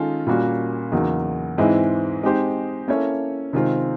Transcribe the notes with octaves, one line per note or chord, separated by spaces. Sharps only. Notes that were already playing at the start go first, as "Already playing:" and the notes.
Already playing: D#3 G#3 C#4 F4 A4
A#2 G3 A#3 C#4 F#4
E2 C#3 F#3 A#3 D#4
G#2 E3 G#3 C4 E4
G#3 C4 D#4 G4 C5
A#3 C#4 E4 A4 C#5
C3 D#3 G#3 C4 F4